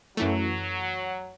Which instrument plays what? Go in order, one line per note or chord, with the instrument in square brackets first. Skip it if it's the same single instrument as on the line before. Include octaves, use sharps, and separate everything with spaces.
[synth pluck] F#2 E3 A3 [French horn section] F#3